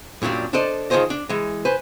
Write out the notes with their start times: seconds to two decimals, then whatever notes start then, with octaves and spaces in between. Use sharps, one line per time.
0.22 F#2 A#2 F#3 G3 D4
0.53 D4 A4 C5 D5 D#5
0.90 D#3 F3 F4 G#4 C5 D#5
1.10 D4
1.29 E3 G#3
1.65 B4 C5 G#5